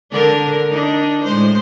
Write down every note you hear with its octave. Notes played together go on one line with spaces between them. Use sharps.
D3 D4 A#4
D4 D#4
A2 G#3 C5